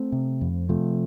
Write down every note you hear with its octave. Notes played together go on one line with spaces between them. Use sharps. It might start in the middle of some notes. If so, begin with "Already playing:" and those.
Already playing: A3 C4
C3
F2
C3 F3 A3